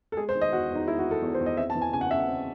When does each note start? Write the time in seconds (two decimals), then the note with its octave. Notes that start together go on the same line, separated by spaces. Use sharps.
0.12 A4
0.17 G#3 G#4
0.29 C5
0.35 D#3
0.41 D#5
0.52 E2 F#4
0.71 E2 D#4
0.87 G#3 E4
0.99 F#4
1.05 D#3
1.11 A4
1.22 E2
1.34 C5
1.41 E2
1.46 D#5
1.57 C4 E5
1.70 A5
1.75 E3
1.82 G#5
1.93 C#3 G#5
2.01 F#5
2.11 C#3 E5
2.20 F#5
2.28 C4